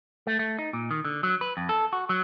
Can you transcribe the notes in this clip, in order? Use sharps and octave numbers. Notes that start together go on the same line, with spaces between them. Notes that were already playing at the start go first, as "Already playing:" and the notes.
A3
A3
D#4
A#2
D#3
D3
F#3
B4
F2
A4
F#4
F#3